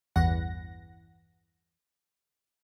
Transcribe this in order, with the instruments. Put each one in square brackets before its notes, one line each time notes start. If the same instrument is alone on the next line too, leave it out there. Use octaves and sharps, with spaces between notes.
[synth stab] A1 E2 G2 E3 F#5 A#6